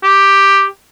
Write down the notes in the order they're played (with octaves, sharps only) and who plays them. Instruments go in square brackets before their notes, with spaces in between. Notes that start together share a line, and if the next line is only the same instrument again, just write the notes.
[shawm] G4